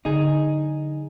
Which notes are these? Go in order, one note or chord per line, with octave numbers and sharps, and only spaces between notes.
D3 F#3 D#4 G#4